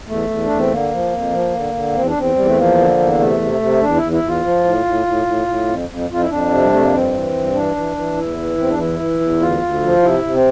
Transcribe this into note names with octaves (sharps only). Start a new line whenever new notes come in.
E2 A3
E2
D4
E2
C4
D3 A#3
F3
F2
F3
D3
D3
E2 C4
D4
E2 C4
E2 G3
A3
F3 A#3
D3
E2
C3 A3
C3
C3
E2 D4
E4
E2
E4
E2 F4
F3
A2
A2
A2
A2
A2
F2
F2
F2 F4
E4
F2 D4
C3
G3
F2 A3
A#3
G2 C4
E3
G2
E3 D4
E3
E3
E2 E4
E3
E2 C4
D4
E3 E4
E3
E2
D2 F4
D2
F3
C3 E4
C3
C4